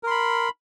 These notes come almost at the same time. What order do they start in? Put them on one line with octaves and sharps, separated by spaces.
A#4 C6 B5